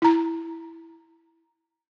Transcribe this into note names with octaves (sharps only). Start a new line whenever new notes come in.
E4 A#5